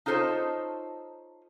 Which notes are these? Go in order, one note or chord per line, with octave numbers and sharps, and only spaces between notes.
D#4 F4 A4 C5 C#5 D#5